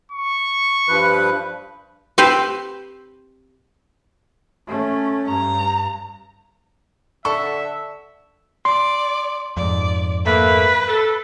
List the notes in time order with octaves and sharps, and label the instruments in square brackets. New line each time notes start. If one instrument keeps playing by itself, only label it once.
[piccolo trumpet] C#6
[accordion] G2 F3 B4
[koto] C4 G4 B4 C5
[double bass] A3 C#4
[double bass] G2 [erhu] A#5
[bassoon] D3 [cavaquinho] A4 F#5 [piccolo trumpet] E5 [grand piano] C#6
[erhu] D5 [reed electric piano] C6
[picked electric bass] F2 G#2 [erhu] D5
[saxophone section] A3 A#3 [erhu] B4
[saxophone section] A4